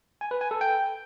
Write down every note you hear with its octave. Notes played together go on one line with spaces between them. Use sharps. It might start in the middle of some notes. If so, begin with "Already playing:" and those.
G#5
B4
G#5
A4
G5